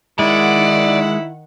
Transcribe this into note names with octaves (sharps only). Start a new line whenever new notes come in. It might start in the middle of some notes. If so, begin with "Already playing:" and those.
D#3 G#3 E4 D5 F#5